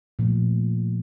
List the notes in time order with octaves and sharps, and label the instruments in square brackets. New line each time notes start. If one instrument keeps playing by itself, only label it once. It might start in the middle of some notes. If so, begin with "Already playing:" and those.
[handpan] A#2 F3 A3